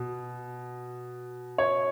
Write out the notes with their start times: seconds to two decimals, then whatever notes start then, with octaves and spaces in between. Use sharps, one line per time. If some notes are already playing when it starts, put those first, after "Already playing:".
Already playing: B2
1.58 C#5